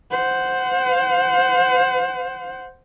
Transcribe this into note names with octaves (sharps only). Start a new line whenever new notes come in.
C5 F#5